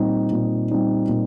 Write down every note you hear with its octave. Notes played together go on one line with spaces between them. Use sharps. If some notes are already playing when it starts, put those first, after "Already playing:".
Already playing: A#2 G3 C4 D#4
A#2
G3 C4 D#4
A#2